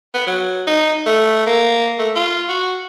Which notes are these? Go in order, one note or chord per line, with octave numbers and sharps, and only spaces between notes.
B3
F#3
D#4
A3
A#3
A3
F4
F#4